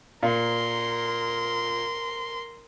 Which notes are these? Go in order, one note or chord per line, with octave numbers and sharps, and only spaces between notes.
A#2 A#4 C6